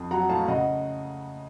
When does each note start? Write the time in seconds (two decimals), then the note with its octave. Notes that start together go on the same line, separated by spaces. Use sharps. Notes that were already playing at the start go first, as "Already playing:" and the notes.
Already playing: F2
0.11 F#3 F#5 A#5
0.29 A2 F5 A5
0.48 C#3 D#5 F#5